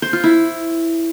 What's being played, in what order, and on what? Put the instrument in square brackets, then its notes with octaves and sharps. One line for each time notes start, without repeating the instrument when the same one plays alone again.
[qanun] C5
F4
E4